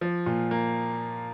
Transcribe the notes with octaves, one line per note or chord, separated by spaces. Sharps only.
F3
A#2
A#3